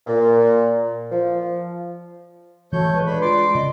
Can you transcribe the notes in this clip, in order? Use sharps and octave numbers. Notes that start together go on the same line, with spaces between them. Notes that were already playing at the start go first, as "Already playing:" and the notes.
A#2
F3
E3 A3 F#4 C#5 G6
G#3 B4
D4 B5
F4 D5 C6 D6
C#3 D#5